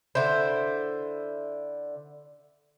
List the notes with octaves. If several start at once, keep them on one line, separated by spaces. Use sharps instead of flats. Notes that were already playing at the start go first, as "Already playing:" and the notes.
D3 E4 C5